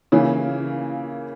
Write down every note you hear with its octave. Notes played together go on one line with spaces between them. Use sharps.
C#3 E3 A#3